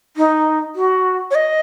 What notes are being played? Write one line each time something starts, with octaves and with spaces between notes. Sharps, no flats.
D#4
F#4
C#5
D#5